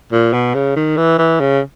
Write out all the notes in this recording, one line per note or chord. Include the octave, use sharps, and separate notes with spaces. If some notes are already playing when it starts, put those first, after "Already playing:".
A#2
B2
C#3
D#3
E3
E3
C#3